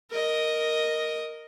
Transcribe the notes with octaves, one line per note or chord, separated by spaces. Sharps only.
A#4 D#5